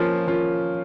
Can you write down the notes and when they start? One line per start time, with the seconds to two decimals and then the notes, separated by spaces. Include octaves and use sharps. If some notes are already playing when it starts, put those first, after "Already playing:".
Already playing: F3 A#3 C#4 F4
0.27 F3 A#3 C#4 F4